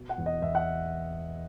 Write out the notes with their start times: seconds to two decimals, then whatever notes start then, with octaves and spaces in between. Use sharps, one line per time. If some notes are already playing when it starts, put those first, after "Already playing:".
Already playing: B2
0.09 F#5
0.18 E2
0.26 D#5
0.42 E2 E5
0.55 F#5